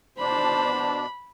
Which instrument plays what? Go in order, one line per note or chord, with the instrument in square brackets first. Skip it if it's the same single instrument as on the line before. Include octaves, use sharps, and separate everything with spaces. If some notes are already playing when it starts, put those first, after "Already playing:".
[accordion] B2 D4 [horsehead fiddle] C5 A5 [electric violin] B5